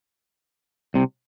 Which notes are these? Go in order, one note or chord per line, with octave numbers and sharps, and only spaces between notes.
C2 C3